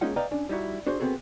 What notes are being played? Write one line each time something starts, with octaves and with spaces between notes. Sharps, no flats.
G#3 A#3 C#4 D#4 F4 F#5
B4 D5 D#5 F5 G5 A#5
C#4 D4
G3 D#4 E4 F#4
D4 F#4 G#4 C5
B3 C4 D4 F#4 G#4 A4